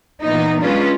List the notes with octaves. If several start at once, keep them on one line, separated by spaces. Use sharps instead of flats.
A#2 E3 B3 D#4
F#3 G#3 C#4 D4 F4 B4